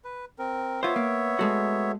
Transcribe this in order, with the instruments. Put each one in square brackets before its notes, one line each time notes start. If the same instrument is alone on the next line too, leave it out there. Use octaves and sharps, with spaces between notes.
[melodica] B4
C4 A#4
[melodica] B3 C#5 E5 [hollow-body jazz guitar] F4 C5
[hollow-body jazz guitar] A#3
G#3 A3 F#4